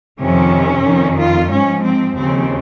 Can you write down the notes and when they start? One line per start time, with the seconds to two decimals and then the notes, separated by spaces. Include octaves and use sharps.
0.19 F2 C3 D#3 C#4
0.85 F2 D#3
1.18 F4
1.50 G#2 F3 C#4
1.82 C4
2.15 D#2 C#3 F3 C4